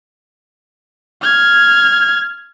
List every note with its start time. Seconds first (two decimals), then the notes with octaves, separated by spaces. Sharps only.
1.22 F6 G#6